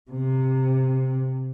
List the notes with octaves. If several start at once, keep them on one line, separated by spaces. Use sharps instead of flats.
C3